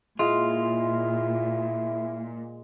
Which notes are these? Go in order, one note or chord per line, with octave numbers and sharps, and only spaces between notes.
A#2 G#3 E4 F4